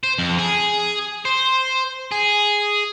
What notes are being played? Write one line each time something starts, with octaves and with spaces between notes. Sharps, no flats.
C5
F2
G#4
C5
G#4